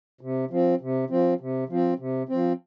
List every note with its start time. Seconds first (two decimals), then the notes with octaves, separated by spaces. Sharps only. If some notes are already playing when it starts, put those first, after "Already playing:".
0.21 C3
0.51 F3 C4
0.81 C3
1.10 F3 C4
1.40 C3
1.69 F3 C4
1.99 C3
2.29 F3 C4